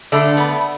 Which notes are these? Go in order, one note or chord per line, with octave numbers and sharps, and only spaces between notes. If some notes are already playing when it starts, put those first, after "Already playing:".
D3 A3 D4
B3